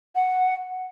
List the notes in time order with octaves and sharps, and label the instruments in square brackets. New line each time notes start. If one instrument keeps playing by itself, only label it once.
[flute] F#5